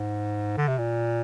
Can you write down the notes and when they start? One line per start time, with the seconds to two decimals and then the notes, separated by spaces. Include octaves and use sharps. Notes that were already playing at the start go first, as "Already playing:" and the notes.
Already playing: G#2
0.57 D3
0.68 C3
0.79 A#2